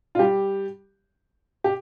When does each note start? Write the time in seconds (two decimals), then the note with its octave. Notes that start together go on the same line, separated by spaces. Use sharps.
0.15 F4
0.19 G3 G4
1.64 G4